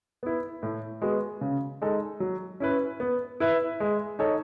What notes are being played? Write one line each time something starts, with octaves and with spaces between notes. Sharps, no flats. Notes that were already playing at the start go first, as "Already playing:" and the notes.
B3 E4
A2
G#3 B3 F#4
C#3
G#3 D#4 A4
F#3
C#4 E4 B4
B3
E4 B4 E5
G#3
D#4 A4 C#5